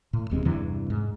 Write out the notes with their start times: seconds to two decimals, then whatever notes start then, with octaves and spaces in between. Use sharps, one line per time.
0.13 A2
0.30 E1 D#2 G#3 C4
0.45 E2 G2 C3 E3
0.90 G#2